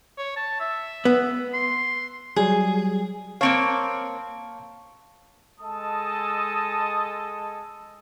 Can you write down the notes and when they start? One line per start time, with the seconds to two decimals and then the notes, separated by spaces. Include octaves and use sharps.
0.18 C#5
0.36 A5
0.60 E5
1.05 B3
1.54 C6
2.36 F#3 G3 G#4
3.41 A#3 C4 C#5 F5 A5 C#6
5.61 G#3 A4 D#5 A5 D#6